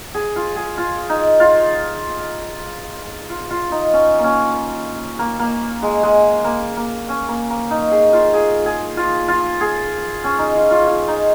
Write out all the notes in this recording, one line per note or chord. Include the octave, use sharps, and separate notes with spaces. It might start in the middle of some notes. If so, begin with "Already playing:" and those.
G#4
F4
G#4
F4
D#4
F4
F4
F4
D#4
C#4
A#3
C#4
A#3
A#3
G#3
G#3
A#3
A#3
C#4
A#3
A#3
D#4
G#4
F4
G#4
G#4
F4
F4
G#4
C#4
D#4
F4
F4
F4
D#4